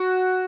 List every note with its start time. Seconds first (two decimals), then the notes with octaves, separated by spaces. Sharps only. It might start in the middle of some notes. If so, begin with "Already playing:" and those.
Already playing: F#4